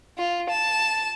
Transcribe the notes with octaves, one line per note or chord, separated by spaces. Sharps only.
F4
A5